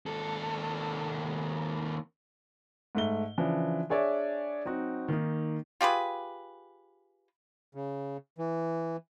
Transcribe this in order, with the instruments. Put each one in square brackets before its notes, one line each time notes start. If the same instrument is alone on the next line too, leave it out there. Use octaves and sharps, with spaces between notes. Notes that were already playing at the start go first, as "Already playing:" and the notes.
[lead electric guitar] D#2 A4
[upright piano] G#2 A3 G7
C#3 E3 F3 D4
D4 G#4 C#5 D5 E5
F#3 C4 D#4 F#4
D#3 A#3 D#4
[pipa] F4 G4 G#4 B4
[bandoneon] C#3
E3